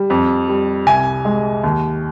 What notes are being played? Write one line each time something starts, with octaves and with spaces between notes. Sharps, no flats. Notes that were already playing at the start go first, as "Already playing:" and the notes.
Already playing: G3
F2
G3
C2 G#5
G#3
D#2